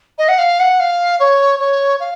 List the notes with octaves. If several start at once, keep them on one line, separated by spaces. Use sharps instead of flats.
D#5
F#5
F5
F#5
F5
C#5
C#5
F5